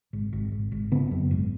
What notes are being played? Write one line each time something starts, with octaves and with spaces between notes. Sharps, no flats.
G#1
G#1
G#1
G#1
C#3 B3
F#2
G#1